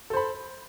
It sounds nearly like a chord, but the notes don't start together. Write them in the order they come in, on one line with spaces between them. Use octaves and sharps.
A4 C5 B5